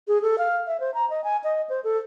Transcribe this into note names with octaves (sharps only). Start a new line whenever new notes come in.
G#4
A4
F5
E5
C5
A#5
D#5
G#5
D#5
C5
A4